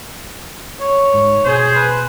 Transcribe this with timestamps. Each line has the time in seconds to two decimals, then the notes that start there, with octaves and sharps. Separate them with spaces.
0.80 C#5
1.14 G#2
1.46 B2 G#4 C5
1.76 B4